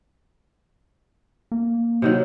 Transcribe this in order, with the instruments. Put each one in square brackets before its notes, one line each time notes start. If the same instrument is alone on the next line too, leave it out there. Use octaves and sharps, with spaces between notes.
[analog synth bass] A#3
[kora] C3 D#3 F#3